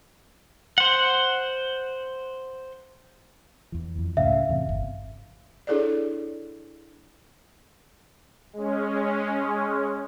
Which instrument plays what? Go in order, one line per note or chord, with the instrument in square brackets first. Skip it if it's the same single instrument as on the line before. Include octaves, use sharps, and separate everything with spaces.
[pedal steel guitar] C5 F#5
[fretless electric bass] E2 E3
F2
[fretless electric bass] C#2 A2 C#3 [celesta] E5 F5
[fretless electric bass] E2 C3
G1
[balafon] D4 E4 G#4 A4 C#5 D5
[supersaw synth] G#3 C#4